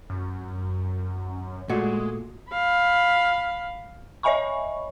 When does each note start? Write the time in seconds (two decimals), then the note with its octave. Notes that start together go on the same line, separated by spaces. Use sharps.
0.10 F#2
1.69 A#2 G#3 A3 F#4
2.51 F5 B5
4.23 C#5 D#5 E5 G#5 B5 C#6